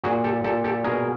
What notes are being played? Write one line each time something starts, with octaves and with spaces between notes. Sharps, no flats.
A#2 F#4 G#4
G4 A4
A#2 G4 A4
G4 A4
B2 G#4 A#4